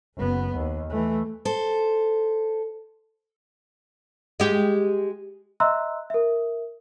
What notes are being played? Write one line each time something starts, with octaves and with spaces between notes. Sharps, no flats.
F#1 B3
D#2
E3 A3
A4 C5
G#3 G4
D#5 E5 A#5 C6 E6 F#6
A#4 E5